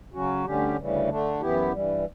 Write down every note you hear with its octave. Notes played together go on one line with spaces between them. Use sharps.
C#3 F#3 C#4 F#4
D2 D3 G3 C#4 G4
D2 C#3 E3 G3
D3 A3 D4
F#2 E3 B3 E4 G4
G2 E3 G3